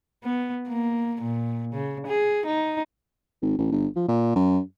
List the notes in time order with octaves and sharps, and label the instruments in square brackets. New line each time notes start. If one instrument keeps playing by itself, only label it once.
[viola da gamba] B3
A#3
A#2
C#3
G#4
D#4
[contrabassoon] G#1
A1
G1
F3
A#2
F#2